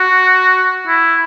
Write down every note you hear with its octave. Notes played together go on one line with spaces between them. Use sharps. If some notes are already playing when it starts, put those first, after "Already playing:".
Already playing: F#4
E4